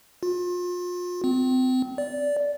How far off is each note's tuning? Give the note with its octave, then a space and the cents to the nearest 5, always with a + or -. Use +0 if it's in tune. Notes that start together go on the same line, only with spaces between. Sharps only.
F4 +35
C4 -30
D5 -15